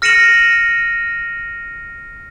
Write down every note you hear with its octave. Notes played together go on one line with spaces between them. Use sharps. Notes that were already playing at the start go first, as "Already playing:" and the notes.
F6 A#6 C#7 D#7 E7 F#7